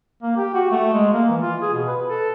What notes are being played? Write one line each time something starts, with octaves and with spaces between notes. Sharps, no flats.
A#3
G4
F#4
A3
G#3
A#3
E3
F4
G#4
B2
B4
A4